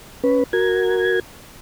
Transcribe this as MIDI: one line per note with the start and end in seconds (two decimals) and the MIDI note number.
0.24 0.44 61
0.24 0.44 71
0.53 1.19 66
0.53 1.19 70
0.53 1.19 92